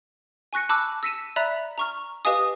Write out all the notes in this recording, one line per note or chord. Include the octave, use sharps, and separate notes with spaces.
G#5 C#6 F#6 A#6 C#7
A5 B5 D6 E6 F#6
E6 A#6 B6 C#7 D#7 E7
D5 E5 A#5 B5 F#6 B6
A#5 C#6 F6
G4 B4 D#5 F5 G#5 D#6